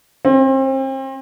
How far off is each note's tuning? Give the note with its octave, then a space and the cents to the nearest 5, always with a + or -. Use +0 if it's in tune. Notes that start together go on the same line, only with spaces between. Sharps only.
C4 +35